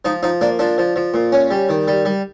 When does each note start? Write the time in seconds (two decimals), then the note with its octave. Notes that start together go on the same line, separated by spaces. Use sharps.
0.05 F3 D#4
0.23 F3 D#4
0.41 A#3 D4
0.59 F3 D4
0.78 F3
0.96 F3
1.14 A#2
1.32 C#4
1.51 G3
1.69 D#3
1.88 G3
2.05 G3